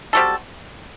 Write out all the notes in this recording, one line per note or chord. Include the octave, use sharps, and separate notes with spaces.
G3 C4 F#4 A4